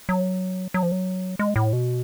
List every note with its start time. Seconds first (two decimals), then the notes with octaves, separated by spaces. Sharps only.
0.09 F#3
0.74 F#3
0.83 F3
0.92 F#3
1.39 G#3
1.56 A2
1.73 B2